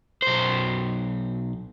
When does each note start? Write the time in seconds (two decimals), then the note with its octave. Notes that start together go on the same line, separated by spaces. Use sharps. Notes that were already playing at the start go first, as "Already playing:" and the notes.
0.22 B1 C5